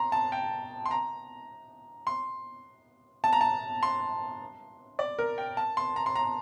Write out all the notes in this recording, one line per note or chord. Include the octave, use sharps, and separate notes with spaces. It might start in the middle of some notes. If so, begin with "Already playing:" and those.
Already playing: A#5 C6
A5
G5
C6
A#5
C6
A5
A#5
A5
C6
D5
A#4
G5
A5
C6
A#5
C6
A#5